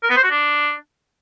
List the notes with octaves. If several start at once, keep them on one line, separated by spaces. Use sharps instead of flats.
A#4
B3
C5
F#4
D4